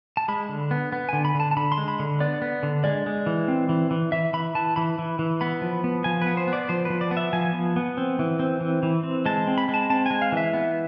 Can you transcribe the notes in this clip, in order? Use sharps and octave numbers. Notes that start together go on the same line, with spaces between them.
A5
G#3 B5
D3
B3
B3
D3 G#5
B5
D3
A5
A5
D3 B5
C6
G#3
B5
D3
B3 D5
B3
D3
G#3 D5
G#3
E3
C4
E3
E3
E3 E5
E3 B5
E3 A5
E3 B5
E3
E3
B3 B5
F3
B3
F3 G#5
B4
B3
C5
B3
D5
F3 C5
F3 B4
D5
B3
E5
F3 G#5
B3
B3
C4
E3
C4
E3
E3
C4
G#3 A5
C4
B5
G#3
A5
C4 A5
G#3 G#5
F5
E3 E5
B3